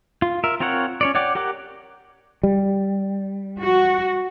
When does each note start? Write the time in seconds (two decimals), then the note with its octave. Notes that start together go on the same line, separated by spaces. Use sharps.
0.22 F4
0.44 A#4 E5
0.60 C4 F4 A#4 C#5 F#5
1.01 C#4 C#5 D5
1.15 C#5 D5 F#5 G5 D6
1.35 G4 A#4 F#5 D6
2.43 G3
3.60 F#4